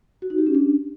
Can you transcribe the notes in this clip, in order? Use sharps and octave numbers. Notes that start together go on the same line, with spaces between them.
F#4
D#4
G4
C#4
D4